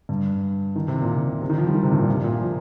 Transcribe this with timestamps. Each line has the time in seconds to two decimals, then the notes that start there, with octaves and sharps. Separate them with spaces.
0.09 G2
0.76 D#3
0.88 C3
1.02 A#2
1.15 C3
1.42 C3
1.50 D#3
1.58 F3
1.67 G3
1.74 D#3
1.83 C3
1.91 G2
1.99 A#2
2.08 C3
2.24 A#2
2.41 F3